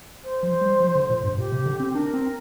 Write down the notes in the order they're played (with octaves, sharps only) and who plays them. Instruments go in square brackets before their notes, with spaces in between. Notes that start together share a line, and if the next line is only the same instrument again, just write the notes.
[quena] C5
[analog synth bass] F3
G3
F3
D3
A#2
G2
[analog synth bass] A#2 [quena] G4
[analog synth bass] C3
D3
C4
[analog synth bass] D4 [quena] A#4
[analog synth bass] C4